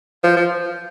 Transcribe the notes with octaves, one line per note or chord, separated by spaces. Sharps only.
F3
F3